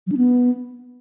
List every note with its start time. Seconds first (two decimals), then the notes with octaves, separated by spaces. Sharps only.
0.07 F#3
0.12 D4
0.17 B3